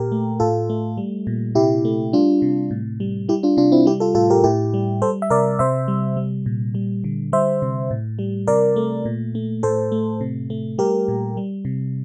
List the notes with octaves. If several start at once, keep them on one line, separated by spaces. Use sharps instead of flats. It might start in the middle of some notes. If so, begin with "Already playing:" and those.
Already playing: A#2 G4 A#4
A3
A2 F4 A4
A3
G3
A#2
C3 E4 G4
A3
G3 D4 F4
C3
A2
G3
G3 E4 G4
D4 F4
C3 D4 F4
C4 E4
G3 E4 G4
F4 A4
A2 F4 A4
G4 A#4
A2 E4 G4
G3
G3 A4 C5
E5
C3 A#4 D5
C3 C5 E5
G3
G3
A#2
G3
D3
G3 C5 E5
C3
A2
G3
C3 A#4 D5
A3
A#2
A3
A2 A4 C5
A3
C3
A3
G3 G4 A#4
A#2
G3
C3